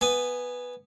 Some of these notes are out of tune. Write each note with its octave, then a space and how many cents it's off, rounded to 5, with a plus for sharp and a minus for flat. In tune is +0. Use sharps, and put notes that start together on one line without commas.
B3 +0 G#5 -5